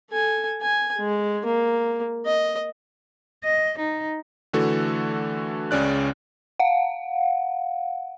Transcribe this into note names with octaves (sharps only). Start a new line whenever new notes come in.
A4 G#5
G#5
G#3
A#3
D#5
D#5
D#4
D3 E3 A3 F#4 A4
C#2 C#3 C#4 D5 F#6
F5 F#5